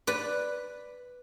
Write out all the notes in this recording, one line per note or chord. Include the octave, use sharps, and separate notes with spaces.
B4 D5